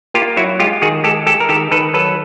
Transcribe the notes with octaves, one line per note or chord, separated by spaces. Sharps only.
A#3 F4 G4
F#3 E4 F#4
G#3 F4 G4
D#3 F#4 G#4
G#3 G4 A4
G#3 G4 A4
A#4
D#3 G4 A4
D#3 A4 B4
F#3 A4 B4